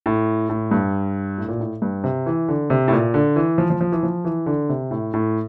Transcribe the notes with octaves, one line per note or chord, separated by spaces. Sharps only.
A2
A2
G2
A2
A#2
A2
G2
C3
E3
D3
C3
A2
A#2
D3
E3
F3
F3
F3
E3
F3
E3
D3
C3
A2
A2